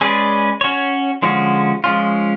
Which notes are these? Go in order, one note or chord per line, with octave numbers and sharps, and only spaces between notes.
G#3 C#4 G#4 B4 D5
C#4 F#4 C#5
D3 F3 G#3 C#4 F#4
F3 G#3 C#4 F4